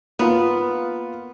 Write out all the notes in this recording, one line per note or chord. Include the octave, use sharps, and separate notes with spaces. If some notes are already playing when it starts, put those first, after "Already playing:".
A#3 B3 F4